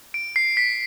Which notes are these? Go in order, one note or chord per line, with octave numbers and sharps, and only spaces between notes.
D7
C7
B6